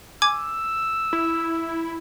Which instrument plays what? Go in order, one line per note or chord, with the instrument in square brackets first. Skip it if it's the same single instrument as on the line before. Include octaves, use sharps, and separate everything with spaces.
[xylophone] G#5 D6 G#6 [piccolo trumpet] E6
[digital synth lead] E4